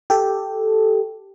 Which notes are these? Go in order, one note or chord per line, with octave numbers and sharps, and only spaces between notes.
G4 A4